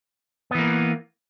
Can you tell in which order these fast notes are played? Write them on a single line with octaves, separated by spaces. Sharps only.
B3 E3 A#3